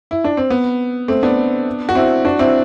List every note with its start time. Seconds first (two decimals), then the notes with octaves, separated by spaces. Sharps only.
0.11 E4
0.24 D4
0.37 C4
0.50 B3
1.08 A3 C4
1.23 B3 D4
1.89 F#4
1.95 C4 E4
2.25 D4 F#4
2.39 C4 E4